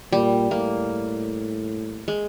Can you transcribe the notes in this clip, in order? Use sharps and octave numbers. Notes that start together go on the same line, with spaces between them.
A#2 G3
A2 A#3
G#3